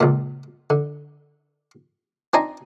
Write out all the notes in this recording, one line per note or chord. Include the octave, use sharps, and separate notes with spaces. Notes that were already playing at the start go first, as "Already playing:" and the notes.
C#2 A#2
D3
C4 D4 D#4 G#5 A#5